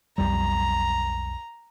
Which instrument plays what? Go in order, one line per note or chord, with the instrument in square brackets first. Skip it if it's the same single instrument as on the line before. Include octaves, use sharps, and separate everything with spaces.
[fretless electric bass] B1 F2 G3 [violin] A#5